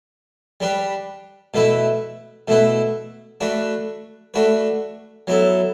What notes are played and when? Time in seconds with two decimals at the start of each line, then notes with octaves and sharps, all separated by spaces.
0.60 G3 D4 G4 B4
1.54 B2 A3 E4 B4
2.48 B2 A3 E4 B4
3.41 A3 D4 F#4 B4
4.34 A3 D4 F#4 B4
5.27 F#3 B3 E4 A4